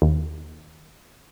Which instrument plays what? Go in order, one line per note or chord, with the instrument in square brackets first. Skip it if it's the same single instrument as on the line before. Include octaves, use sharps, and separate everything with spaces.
[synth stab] D#2